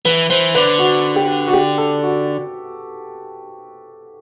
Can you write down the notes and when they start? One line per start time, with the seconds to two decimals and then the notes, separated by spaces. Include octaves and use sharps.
0.05 E3 B4
0.30 E3 C5
0.55 D3 B4
0.79 F#4
1.16 G4
1.48 F#4
1.53 G4
1.78 A4
2.03 F#4